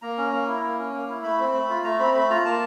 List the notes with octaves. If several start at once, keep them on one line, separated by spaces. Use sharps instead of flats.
A#3 A#5
C#4
A#3
E4
A#3
C#4
A#3
E4
A3 B5
C4
A3
F4
A3 A#5
C4 B5
A3 B5
F4 A#5
A#3 A5